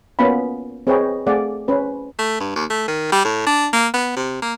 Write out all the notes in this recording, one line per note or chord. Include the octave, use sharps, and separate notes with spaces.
A#3 B3 C#4 F4 F5 B5
C4 G#4 B4 C#5 D#5 G5
A3 C4 G#4 D5 F5 F#5
C#4 B4 C5
A3
G2
D#2
A3
D#3
G3
A2
D4
A#3
B3
C3
A#3